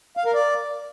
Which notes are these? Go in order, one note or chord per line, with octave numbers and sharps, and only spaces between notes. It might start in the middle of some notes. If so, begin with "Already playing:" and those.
F5
A#4
D5